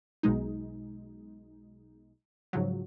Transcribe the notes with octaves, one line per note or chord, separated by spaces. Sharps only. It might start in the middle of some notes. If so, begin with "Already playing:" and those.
B1 B2 G#3 D#4
G#2 C#3 F3 F#3